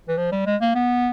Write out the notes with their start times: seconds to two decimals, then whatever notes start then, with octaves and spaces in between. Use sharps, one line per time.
0.08 E3
0.18 F3
0.32 G3
0.46 G#3
0.61 A#3
0.75 B3